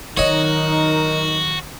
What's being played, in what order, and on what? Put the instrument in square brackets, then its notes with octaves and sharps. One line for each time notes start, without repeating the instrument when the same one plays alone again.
[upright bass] D#3 F#3 [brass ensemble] D#4 A#4 [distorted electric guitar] F#4 [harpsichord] C#5 D#5